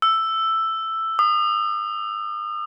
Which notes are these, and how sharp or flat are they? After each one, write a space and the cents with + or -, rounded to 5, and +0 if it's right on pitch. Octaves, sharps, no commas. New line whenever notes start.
E6 +5
D#6 -35